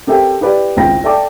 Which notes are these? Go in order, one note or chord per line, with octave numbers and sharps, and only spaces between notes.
C4 G4 A4 A#4 E5 G5
E4 G4 B4 D5
G#1 C#2 E4 G5 B5 A#6
A4 D5 E5 G5 A5 D6